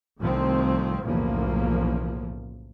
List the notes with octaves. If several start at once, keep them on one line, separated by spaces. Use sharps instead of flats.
C2 D#3 F3 A3 C4
B1 E2 A2 C#3 F3 A#3